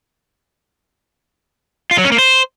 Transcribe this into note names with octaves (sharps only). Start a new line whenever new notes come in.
F4
F#3
C#4
A#3
C5